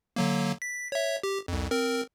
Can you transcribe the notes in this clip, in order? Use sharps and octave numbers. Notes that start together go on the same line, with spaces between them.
D3 F#3 A#3
B6
C#5 E5
G4
C2 F2
C4 A#4